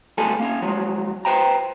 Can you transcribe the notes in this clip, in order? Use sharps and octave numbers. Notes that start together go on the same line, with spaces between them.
D2 G2 F#3 A3 A4 G#5
A#3 C#4
F3 F#3 G#3
B4 C5 G5 A#5